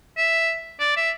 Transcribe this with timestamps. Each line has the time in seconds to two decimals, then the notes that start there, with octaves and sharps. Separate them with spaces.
0.17 E5
0.80 D5
0.97 E5